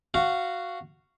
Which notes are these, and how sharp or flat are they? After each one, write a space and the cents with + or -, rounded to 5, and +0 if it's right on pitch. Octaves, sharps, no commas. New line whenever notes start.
F#4 +0 F5 -15